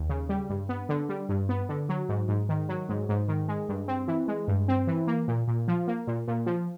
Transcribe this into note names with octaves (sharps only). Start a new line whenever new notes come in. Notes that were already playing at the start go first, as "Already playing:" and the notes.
Already playing: D#2
C#3
G3
G2
B3
D3
G3
G2
B3
D3
F#3
G#2
G#2
D#3
F#3
G#2
G#2
D#3
G#3
G2
C4
E3
G#3
G2
C4
E3
A#3
A#2
A#2
F3
A#3
A#2
A#2
F3